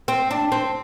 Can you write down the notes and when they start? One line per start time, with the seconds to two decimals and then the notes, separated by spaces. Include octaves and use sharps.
0.08 C4
0.31 D4
0.52 C4